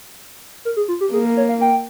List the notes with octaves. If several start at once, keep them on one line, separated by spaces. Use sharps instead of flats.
A#4
G#4
F4
G4
A#3 G#4
A#4
C#5
F5
G5